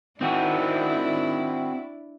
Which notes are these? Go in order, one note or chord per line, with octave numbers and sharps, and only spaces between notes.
D#3 C4 D4 E4 F#4